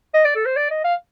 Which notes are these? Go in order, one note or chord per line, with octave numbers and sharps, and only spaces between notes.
D#5
D5
A4
C5
D5
D#5
F5